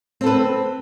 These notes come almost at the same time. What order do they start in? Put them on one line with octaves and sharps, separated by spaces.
C4 A4 B4